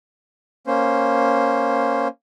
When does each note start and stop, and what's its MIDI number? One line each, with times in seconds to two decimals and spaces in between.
0.67 2.08 58
0.67 2.08 61
0.67 2.08 72